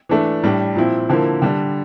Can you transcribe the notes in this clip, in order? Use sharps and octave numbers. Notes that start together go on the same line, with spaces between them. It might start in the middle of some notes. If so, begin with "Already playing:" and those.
E3 A3 D4
A2 G3 D4
A#2 F3 C4 E4
D3 F3 A#3 E4
D3 G3 D4